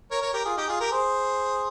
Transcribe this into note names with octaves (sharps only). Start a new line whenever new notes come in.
A#4 C#5
A#4 C#5
G4 A#4
F4 G#4
D#4 G4
F4 G#4
G4 A#4
G#4 C5